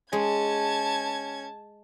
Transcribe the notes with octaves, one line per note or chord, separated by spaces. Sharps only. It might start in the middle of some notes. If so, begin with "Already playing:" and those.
G#3 C#4 A5 G#6